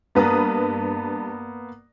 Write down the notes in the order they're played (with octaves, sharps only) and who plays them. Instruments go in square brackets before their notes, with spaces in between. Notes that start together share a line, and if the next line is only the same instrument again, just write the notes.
[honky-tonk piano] G2 B4 D#6 [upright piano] A#3 B3 A#5